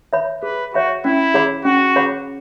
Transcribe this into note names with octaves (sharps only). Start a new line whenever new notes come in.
C#5 E5 B5
G#4 B4
F#4 C#5 E5 B5
C#4 E4
G#4 C#5 F#5 B5
C#4 F#4
G#4 C#5 F#5 B5